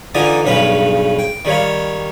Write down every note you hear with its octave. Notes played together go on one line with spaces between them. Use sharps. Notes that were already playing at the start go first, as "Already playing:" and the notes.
D3 E3 D#4 F4 D5 D#5
B1 G2 C#3 B4 F5
G5
D#3 G3 C#5 F5